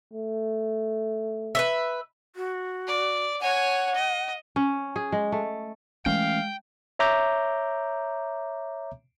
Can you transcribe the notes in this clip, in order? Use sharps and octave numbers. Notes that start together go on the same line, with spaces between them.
A3
B4 C5 E5
F#4
D5
C#5 F#5 G#5
D#5
C#4
G#4
G#3
A3
E3 G#3 A3 C#4 F5 G5
C#5 E5 A#5 D6 G6